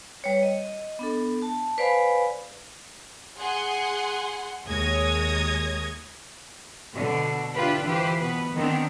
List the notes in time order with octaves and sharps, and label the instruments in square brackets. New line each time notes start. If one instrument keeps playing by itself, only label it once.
[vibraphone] G3 B4 C#5
D#5
B3 D4 A4
A5
B4 C5 D5 F5 G#5 B5
[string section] G#4 F#5 G#5 C6
D#2 G#3 C#5 D#6 G#6 A#6
[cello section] B2 D3
D4 E4 F4 G4 B4
E3 F4 G4 B4 C5
B2 B3 B4
D#3 B3 C4 D4